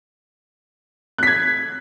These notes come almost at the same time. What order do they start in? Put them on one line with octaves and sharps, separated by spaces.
F#6 B6 G#6